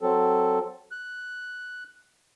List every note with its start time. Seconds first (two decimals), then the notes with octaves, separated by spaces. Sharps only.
0.01 F#3 C4 A4
0.92 F#6